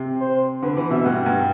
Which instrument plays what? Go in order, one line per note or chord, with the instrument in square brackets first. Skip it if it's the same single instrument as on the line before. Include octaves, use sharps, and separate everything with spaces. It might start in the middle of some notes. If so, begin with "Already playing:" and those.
Already playing: [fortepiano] C3
[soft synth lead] C5
[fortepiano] D3 [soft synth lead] B4
[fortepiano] E3 [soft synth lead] B4
[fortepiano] B2 [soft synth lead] E5
[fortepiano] G2 [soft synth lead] F#5
[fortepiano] G2